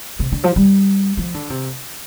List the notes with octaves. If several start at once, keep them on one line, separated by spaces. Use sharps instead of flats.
C3
D3
F3
G3
F3
D3
C3